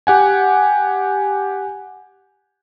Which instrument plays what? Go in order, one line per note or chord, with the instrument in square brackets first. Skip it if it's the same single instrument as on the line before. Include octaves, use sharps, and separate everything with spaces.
[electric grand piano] G4 F#5 G#5